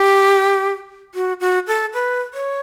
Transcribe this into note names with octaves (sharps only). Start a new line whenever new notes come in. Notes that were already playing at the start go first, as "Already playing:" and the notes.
Already playing: G4
F#4
F#4
A4
B4
C#5